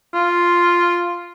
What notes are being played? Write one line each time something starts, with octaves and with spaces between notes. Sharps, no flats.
F4